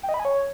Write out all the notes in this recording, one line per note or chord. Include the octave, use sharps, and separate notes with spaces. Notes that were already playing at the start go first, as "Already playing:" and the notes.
G5
D#5
B5
G#5
C#5